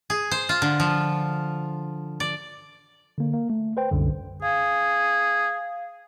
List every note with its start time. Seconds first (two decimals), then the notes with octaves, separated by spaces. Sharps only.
0.10 G#4
0.31 C5
0.49 F4
0.62 D3
0.80 F3
2.20 D5
3.18 D3 A#3
3.33 A#3
3.50 A3
3.77 B4 C5 G5
3.92 C2 F#2 D3
4.42 G#4 F5